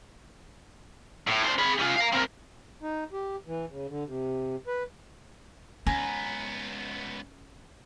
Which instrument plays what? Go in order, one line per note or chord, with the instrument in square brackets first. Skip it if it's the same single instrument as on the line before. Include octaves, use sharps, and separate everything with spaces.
[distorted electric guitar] A2
D4 C5
G#4 B5
C#4 F4
F5 A#5
C4 A#4
[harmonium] D#4
G4
E3
C#3
D3
C3
B4
[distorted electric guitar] C#2 B3 [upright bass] C#4 [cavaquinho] G#5 A#5